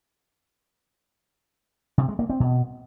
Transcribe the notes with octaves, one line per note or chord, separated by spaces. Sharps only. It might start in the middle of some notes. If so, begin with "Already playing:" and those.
C3
G#3
A#3
C4
B2